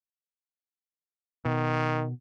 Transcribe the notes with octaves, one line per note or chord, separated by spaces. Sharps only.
B2 D#3